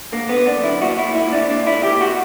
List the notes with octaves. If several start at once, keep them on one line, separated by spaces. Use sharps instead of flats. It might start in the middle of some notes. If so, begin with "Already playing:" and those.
D3 A#3
B3
D3
D4
F#2
E4
A#2 F#4
E4
A#2
E4
A#2
D4
A#2 D4
E4
A#2
G4
A#2
F#4